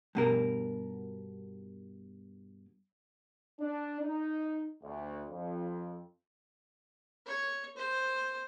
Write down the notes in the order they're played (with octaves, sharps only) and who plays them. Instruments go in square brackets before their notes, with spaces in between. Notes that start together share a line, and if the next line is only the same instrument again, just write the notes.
[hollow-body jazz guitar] G2 B2 A#4
[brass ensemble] D4
D#4
D2
F2
[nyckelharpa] C#5
C5